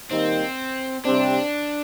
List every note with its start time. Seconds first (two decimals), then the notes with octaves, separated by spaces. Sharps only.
0.10 D#3 G3 A#3 C4 D#4
1.05 C3 G3 C4 D4